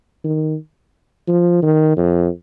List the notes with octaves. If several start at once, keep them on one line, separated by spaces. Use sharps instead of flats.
D#3
F3
D#3
F2